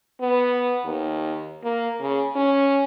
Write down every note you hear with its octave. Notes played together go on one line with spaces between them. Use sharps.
B3
D#2
A#3
C#3
C#4